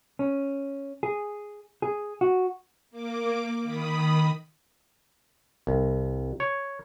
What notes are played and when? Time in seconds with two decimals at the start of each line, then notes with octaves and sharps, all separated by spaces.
0.19 C#4
1.03 G#4
1.82 G#4
2.21 F#4
2.91 A#3 D6
3.63 D#3 B5 D#6
5.67 C2
6.40 C#5